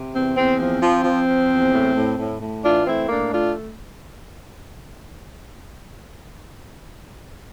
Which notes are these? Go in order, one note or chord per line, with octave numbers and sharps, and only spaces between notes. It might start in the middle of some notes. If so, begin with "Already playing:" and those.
Already playing: C3
E2 C4
E2 C4
F3 C4
F3
F3
F3
E2
A2
A2
A2
A2
E3 D4 F4
A3 C4 E4
A2 A#3 D4
A3 D4 F4